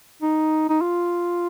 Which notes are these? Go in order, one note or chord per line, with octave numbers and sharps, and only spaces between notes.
D#4
D#4
F4